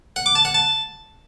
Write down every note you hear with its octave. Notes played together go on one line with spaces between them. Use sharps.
F#5
D6
A5
F#5
A5